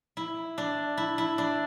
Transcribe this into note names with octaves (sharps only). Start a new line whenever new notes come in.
E4
D4
E4
E4
D4